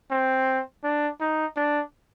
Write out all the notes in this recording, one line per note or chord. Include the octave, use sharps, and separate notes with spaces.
C4
D4
D#4
D4